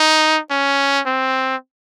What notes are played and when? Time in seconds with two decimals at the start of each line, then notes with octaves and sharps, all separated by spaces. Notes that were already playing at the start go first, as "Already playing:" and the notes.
Already playing: D#4
0.51 C#4
1.06 C4